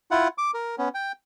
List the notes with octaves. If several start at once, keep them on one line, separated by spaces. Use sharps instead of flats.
E4 F4 F#5
D6
A#4
B3 C#4
G5